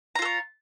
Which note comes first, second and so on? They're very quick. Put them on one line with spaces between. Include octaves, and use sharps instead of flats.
A#5 F4 A4 C#5